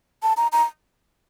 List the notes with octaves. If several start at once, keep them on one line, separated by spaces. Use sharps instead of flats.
A5
A#5
A#5